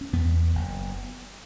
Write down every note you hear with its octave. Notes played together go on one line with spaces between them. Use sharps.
C#4
E2 B3
F#1